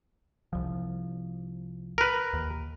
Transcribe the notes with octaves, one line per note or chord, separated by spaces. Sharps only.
C2 F3
A#4 B4
D#2